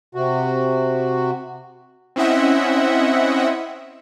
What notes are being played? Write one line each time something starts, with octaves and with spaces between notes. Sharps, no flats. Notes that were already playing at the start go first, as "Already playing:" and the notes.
C3 F#4
C4 C#4 E4 D#5 E5 F#5